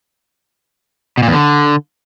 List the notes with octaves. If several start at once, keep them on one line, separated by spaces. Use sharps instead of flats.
B2
A#2
E2
D3